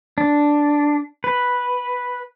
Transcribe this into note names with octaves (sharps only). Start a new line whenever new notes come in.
D4
B4